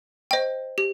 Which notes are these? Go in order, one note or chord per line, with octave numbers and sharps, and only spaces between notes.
C5 D#5 G5
G4